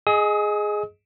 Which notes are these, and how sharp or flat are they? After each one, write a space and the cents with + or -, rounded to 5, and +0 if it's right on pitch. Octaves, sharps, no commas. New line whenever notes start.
G#4 +5 D#5 +0 D#6 +40